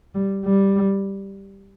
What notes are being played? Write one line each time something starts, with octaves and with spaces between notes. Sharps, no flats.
G3
G3